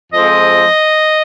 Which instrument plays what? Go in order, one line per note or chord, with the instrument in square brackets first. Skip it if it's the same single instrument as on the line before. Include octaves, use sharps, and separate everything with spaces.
[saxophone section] F2 F3 G#3 C4 D#5